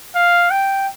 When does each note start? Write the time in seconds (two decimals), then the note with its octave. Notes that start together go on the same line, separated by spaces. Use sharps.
0.15 F5
0.51 G5